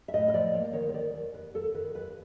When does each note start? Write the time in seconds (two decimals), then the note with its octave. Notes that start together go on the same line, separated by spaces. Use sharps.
0.08 E5
0.13 A2 D#5
0.28 D#5
0.33 F3 D5
0.53 A#3 C#5
0.73 D#3 C#5
0.89 C#5
0.94 D#3 D5
1.14 D#2
1.34 D#2 B4
1.54 D#2 A4
1.75 D#3 B4
1.95 D#2 B4